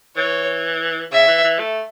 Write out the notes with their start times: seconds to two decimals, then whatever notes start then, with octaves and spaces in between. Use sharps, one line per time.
0.16 E3 C#5
1.12 C#3 E5
1.28 E3
1.44 E3
1.59 A3